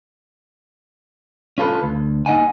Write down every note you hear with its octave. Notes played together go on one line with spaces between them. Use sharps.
C#4 F4 A4 B4
D2
A#3 D#4 D#5 F#5 G#5